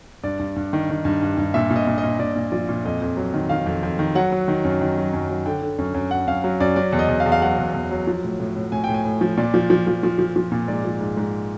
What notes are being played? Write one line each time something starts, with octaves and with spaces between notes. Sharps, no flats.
G2 D5
G2
G2
D#3
D#3
G2
G2
G2
A#2 E5
A#2
D#5
A#2
D#5
A#2
A#2 D5
A#2
F3 D5
A#2
F2 D#5
F2
F#3
D#3
D#3 F5
F2
F2
D#3
F#3 F#5
F#3
D#3
F#2
D#3
F#3
F#2
F#3
D3 G5
D3
F#2
F#2
F#2 F#5
F#2 F5
F#3
F#2 D5
F#3 D5
E2
D#5
E2
F5
E2
F5
F#3 F#5
E2
E2
F#3
F3
A2
A2
A2
A2 G#5
A2 G5
G#5
A2
F3
A#2 D5
F3
F3
F3
F3
F3
F3
A#2
G#2 D5
F3
G#2
G#2